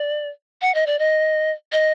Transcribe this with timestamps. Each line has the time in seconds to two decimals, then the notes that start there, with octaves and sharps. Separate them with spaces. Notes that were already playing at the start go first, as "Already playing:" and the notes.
Already playing: D5
0.62 F#5
0.75 D#5
0.87 D5
0.99 D#5
1.72 D#5